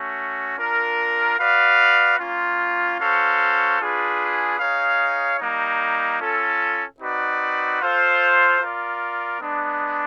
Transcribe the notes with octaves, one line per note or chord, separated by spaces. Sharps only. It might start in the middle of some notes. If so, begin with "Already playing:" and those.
Already playing: A3 C#4 F#4
D4 F4 A#4
F#4 B4 D5 F5
A#3 C#4 F4
C#4 F#4 A4 C5 F5
D4 F4 G#4 B4
D#4 G#4 C#5 F5
G3 A#3 D#4
C#4 F4 A4
C4 D#4 F#4 B4 D5
F4 A4 C5 F5
F4 A#4 D5
G#3 B3 D4